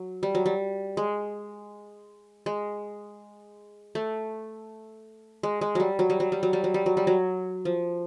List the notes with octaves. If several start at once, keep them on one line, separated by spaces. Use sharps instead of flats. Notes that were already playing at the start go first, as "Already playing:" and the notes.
Already playing: F#3
G3
F#3
G3
G#3
G#3
A3
G#3
G#3
F#3 G3
F#3
G3
F#3
G3
F#3
G3
F#3
G3
F#3
G3
F#3
F3